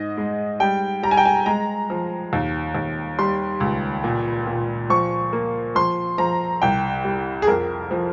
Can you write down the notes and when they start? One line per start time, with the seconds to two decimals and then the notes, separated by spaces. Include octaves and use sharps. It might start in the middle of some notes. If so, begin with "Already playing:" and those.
Already playing: G#2 D#5
0.17 G#3
0.60 G3 G5
1.03 G3 A#5
1.11 G#5
1.17 G5
1.25 G#5
1.46 G#3 A#5
1.90 F3
2.33 D#2
2.75 D#2
3.19 G3 C6
3.60 C#2
4.04 A#2
4.47 A#2
4.90 F3 C#6
5.33 A#3
5.75 F3 C6
6.18 F3 A#5
6.62 C2 G5
7.05 G3
7.42 G#4
7.47 F2 A#4
7.91 F3